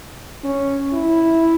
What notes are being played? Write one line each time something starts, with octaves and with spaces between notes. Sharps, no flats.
C#4
E4